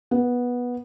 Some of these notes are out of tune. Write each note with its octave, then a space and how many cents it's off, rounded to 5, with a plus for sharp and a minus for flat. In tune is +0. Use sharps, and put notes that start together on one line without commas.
B3 -10